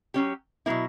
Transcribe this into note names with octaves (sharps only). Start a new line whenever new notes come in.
F#3 C#4 G4
B2 F#3 A#3 E4